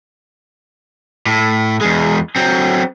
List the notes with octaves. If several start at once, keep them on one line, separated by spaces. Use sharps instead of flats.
A2
E2 G#3
F#3 C4